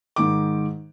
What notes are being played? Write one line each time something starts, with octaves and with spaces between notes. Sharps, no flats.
G#2 D#3 D6